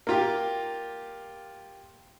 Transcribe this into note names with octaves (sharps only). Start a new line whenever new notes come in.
A#3 F4 G4